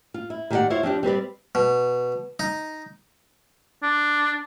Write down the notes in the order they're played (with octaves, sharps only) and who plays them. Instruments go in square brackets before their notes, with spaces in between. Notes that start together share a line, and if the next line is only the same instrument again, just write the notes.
[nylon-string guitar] F4
E4
D#3 G4 G#4 C#5 D5 F#5
E4 F4 C5 C#5
F3 C4 D4 G4
G3 C4 B4 D5
[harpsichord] B2
D#4
[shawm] D4